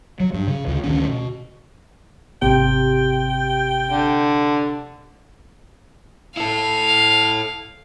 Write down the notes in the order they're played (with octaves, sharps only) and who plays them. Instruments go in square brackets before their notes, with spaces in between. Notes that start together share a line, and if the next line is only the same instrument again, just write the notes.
[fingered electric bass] F#3
G2
C#3
D2 C#3
D2 D#3 C#4
B2
[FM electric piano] G#1 G4 [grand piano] C3 [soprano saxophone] G5
[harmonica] D3
[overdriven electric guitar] E4 A4 [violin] F5